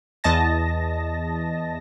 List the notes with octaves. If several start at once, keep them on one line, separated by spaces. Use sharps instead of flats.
E2 D#5 A5 A#6